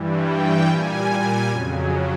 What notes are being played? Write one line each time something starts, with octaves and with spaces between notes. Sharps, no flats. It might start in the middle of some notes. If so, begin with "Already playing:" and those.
Already playing: G2 E3 G3
G5
A#2 G3 G#5
G#5
F2 C#3 F#3